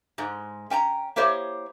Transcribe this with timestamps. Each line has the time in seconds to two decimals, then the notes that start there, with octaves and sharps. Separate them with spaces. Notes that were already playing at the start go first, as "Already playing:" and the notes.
0.18 G#2 G#3
0.70 C#4 G5 A5 A#5
1.16 A#3 E4 G4 C5 C#5 D#5